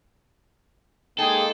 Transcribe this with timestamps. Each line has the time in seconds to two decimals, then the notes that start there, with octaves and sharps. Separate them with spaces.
1.19 G#3 A#3 D#4 G#4 A4 G5